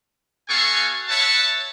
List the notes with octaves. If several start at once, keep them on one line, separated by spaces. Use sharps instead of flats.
B3 F#4 A4 F5 G#5 C#6
B4 C#5 E5 F#5 A5